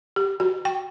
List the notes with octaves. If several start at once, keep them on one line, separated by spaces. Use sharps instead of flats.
G4
F#4
G5